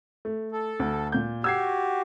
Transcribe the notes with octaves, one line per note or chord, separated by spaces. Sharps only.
A3
A4
D2
A#2 G6
F#4 G4 E6 G#6 C7